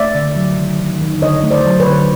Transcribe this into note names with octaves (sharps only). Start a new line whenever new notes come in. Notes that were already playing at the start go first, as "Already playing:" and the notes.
Already playing: A3 D5 E5
D3
F#3
D#3
D#3
D#3
D3 C#5 D#5
A3
C5 D5
F#3
B4 C#5
D3